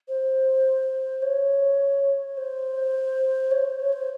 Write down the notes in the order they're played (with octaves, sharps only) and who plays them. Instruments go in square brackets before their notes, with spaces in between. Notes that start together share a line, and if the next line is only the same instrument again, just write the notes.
[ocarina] C5
C#5
C5
C#5
C5
C#5
C5